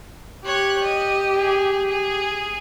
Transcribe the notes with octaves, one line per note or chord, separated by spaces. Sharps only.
G4 C#5 F#6
D#5
G#4
G#4